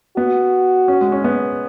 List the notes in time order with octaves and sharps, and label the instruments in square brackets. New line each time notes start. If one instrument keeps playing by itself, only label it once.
[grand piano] B3 [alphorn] F#4
[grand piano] C#4
G#3
C#4
B3